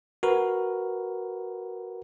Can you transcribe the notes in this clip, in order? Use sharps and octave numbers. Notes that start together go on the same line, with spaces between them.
F#4 A#4 B4